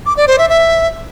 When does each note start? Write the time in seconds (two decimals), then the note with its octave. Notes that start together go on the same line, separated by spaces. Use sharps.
0.06 D6
0.17 D5
0.28 C5
0.38 E5
0.49 E5